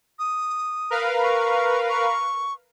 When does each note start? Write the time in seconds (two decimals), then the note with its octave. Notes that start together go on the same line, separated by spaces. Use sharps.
0.19 D#6
0.90 A#4 B4 F5
1.23 C#6
1.89 C#6